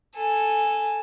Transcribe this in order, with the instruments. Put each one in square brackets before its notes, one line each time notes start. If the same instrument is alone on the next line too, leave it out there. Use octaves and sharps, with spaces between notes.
[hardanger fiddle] A4 G#5